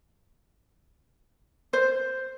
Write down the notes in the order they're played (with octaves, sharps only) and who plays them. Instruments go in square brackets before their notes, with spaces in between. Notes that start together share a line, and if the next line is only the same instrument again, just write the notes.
[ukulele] C5